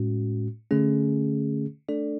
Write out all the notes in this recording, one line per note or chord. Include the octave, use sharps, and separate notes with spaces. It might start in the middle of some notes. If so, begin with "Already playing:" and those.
Already playing: A2 G#3 C#4 F#4
D3 A3 C#4 G#4
A3 D4 A4 D5